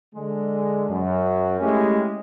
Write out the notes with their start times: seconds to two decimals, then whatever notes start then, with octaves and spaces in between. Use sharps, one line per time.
0.14 D3 G#3
0.89 F#2
1.60 G#3 A3 C#4 E4 G4